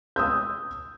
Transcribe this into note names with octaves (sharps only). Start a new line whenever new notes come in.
D#6 E6 G6